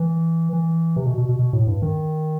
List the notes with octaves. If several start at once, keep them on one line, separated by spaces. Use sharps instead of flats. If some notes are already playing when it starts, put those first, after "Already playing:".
Already playing: E3
E3
C3
B2
B2
B2
B2
A2
G2
D#3